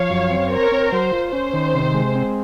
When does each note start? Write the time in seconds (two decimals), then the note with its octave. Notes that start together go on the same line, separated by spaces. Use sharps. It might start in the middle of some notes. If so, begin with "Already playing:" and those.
Already playing: F3 C#5 F5
0.10 F#2
0.30 C4
0.51 A#4 C5 C#5
0.72 C4
0.92 F#3 C5
1.12 F4
1.33 C#4 C5
1.53 D#3
1.74 C3
1.94 G#3
2.15 C4